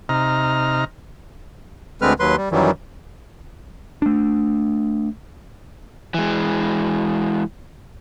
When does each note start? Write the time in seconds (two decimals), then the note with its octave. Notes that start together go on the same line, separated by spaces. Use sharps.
0.09 C3 D#4 A#5 F6
2.02 D2 D3 G#3 C4 B4 F6
2.20 D#2 F#3 B4 C6
2.37 G3
2.52 F#2 D#3 E3 F#3 G3
4.02 A3 D4
6.14 E3 G#3